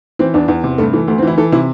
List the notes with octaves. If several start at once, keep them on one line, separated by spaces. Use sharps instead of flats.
E3 C4
E2 D4
E2
C3
G2 A3
E3 A3
D2 A3
C4
E3 E4
E3 A4
C3 E4